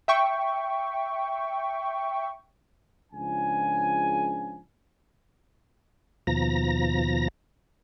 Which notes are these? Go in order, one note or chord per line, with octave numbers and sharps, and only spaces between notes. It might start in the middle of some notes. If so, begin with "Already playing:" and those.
E5 G5 C#6
C#2 C#3 F3 D4 G#5
D#2 B2 F3 A#5 A#6